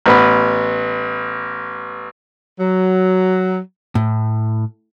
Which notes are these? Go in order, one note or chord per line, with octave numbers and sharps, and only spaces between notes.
A1 B3 B4
F#3
A2